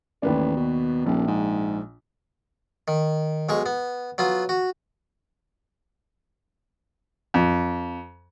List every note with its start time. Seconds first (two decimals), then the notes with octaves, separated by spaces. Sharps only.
0.22 A1 D#2 B4 D5
0.56 B2
1.06 D#1 A#1
1.28 G#2
2.88 D#3
3.49 B1 G#3 C#6
3.66 B3
4.18 F#3 B3 F4
4.49 F#4
7.34 F2